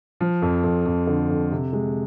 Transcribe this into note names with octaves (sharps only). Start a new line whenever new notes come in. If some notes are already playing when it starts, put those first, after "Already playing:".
F3
F2
F2
F2
D3
F2
C3
G#3